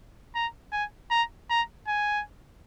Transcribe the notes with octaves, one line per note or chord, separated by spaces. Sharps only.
A#5
G#5
A#5
A#5
G#5